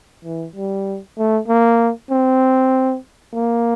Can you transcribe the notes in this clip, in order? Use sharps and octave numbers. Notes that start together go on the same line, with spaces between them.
E3
G3
A3
A#3
C4
A#3